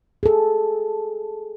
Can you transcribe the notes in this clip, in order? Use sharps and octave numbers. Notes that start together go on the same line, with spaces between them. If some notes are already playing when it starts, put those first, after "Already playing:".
G#4 A4